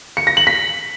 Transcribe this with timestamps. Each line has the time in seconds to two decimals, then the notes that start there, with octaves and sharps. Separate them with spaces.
0.17 C#7
0.27 A#6
0.37 F#7
0.47 B6